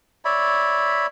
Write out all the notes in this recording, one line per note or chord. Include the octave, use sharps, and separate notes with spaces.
C#5 D5 E5 B5